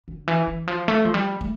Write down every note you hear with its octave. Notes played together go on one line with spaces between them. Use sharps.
D3
E3
E3
F3
A3
F3
G3
A3